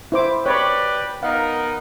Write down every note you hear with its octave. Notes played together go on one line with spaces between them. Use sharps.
E4 C5 D6
G4 B4 C#5 D5 B5
B3 D#4 A#4 F5